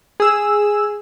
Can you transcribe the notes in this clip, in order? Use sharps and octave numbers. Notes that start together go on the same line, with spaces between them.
G#4 E6